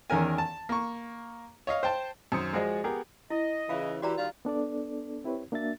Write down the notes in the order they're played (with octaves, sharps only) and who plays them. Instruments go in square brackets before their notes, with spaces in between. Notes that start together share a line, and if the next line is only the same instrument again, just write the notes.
[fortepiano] E2 D#3 C#4 A#4 G#5
A5
A#3 C#6
C#5 D#5 F5
C5 G5 A5
[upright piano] F#2 D#3 C5 D#6 C#7
F3 G#3 F#4 G#4 D5 D#5
B3 G4 G#4 A#4
[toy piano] E4 [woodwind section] D#5
[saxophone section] C#3 E3 [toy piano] F4 F5
[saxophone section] E3 G4 [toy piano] F#4 D5 A#5
[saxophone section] D#3 G3 F4
[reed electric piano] B3 D4 A4 D5
C4 E4 G4 B4 C#5
A#3 D4 F#4 E5 A6